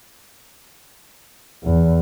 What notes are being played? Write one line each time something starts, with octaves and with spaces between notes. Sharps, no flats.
E2